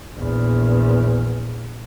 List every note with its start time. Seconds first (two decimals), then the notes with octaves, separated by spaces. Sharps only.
0.15 A#1 E2